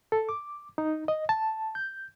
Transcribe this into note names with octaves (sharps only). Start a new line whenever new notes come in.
A4
D6
D#4
D#5
A5
G6